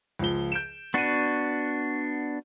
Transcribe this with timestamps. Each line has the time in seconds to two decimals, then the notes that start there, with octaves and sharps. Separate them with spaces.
0.19 C#2 F3 G7
0.52 G6 D7 E7
0.94 B3 D4 F#4 C#6 D#7